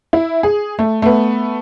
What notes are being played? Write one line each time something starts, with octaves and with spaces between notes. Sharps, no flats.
E4
G#4
A3
A3 B3